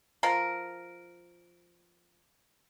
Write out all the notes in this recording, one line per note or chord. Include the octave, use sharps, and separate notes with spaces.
F3 A#4